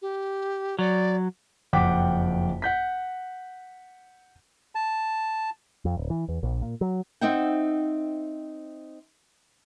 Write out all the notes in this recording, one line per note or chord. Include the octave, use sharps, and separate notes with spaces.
G4
F#3 D5
F#1 F2 F#5 G5 D6 B6
F#5 G6 B6
A5
F2
D1
E3
E2
A#1
A#2
F#3
C4 D#4 C5 E5 F#5 G5